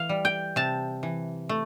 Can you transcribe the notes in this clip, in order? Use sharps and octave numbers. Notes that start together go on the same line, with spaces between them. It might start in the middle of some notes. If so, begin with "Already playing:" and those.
Already playing: E3 F5
G3
G5
C3 A5
E3
A3